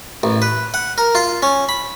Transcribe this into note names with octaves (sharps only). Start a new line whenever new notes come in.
A1
B4
F#5
A#4
F4
C#4
B5